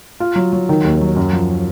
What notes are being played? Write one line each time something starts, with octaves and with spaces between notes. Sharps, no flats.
F4
F#3
F#3
D#3
D#2
F#3
F#2
F3